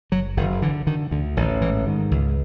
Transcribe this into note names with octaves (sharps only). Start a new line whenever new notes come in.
F#1 F#3
F#1 D#3
D3 E3
D3 D#3
D2 D3
A1 D#3
G#2 E3
G#2 D#3
C#2